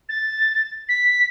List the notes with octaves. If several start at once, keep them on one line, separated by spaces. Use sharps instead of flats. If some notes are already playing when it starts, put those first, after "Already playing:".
A6
B6